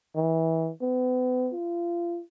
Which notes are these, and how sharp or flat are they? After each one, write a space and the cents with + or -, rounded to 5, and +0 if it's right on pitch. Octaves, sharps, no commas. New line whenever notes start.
E3 -25
B3 +40
F4 -30